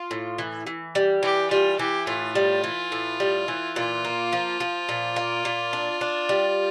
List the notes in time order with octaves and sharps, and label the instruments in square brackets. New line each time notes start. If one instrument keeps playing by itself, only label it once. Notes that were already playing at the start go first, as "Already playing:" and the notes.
Already playing: [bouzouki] F4
A2
E3
E3
G3
[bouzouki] E3 [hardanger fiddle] G4
[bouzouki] G3 [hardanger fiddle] F4
[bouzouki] E3 [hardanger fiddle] G4
[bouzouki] A2 [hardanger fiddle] F4
[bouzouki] G3
E3
A2
G3
E3
[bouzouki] A#2 [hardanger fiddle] F4
[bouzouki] A#3
F3
F3
A#2
A#3
A#2
D4
D4
G3